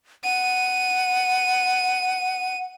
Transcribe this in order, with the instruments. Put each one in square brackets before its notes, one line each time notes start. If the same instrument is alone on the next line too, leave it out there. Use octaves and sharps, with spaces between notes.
[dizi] F#5 [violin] D#7